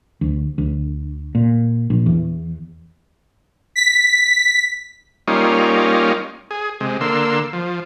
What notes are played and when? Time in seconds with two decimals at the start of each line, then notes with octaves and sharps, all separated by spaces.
0.21 D2
0.58 D2
1.35 A#2
1.90 A#1
2.06 E2
3.76 B6
5.28 G3 A#3 C#4 D#4 F4
6.51 G#4
6.80 C3 G#3
7.01 D3 A#3 C6 E6
7.53 F3